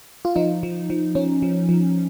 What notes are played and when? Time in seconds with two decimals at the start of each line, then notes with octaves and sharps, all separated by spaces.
0.25 F4
0.36 F3 D#4
0.63 F3
0.90 F3
1.15 F3 C#4
1.42 F3
1.69 F3